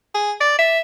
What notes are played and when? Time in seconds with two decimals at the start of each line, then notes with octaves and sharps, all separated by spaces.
0.14 G#4
0.41 D5
0.59 E5